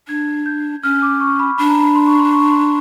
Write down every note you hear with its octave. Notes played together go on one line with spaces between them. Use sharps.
D4 G#6
G6
C#4 F6
D6
C#6
B5
D4 B5
A#5
B5
C6
C#6
C6
C#6
C6